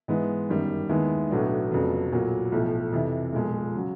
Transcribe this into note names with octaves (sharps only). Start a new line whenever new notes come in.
G#2 E3 G#3 B3
G1 F#2 D#3 G3
D#2 D#3 G#3 B3 E4
B1 A2 F#3 B3 D4
F1 F2 C#3 F#3 B3
B1 A#2 F#3
B1 A2 F3
F2 C3 E3
B1 A#2 F3 G#3
C#3 F#3